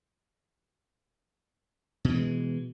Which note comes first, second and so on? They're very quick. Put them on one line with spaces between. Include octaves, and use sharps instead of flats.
B2 E3 G#3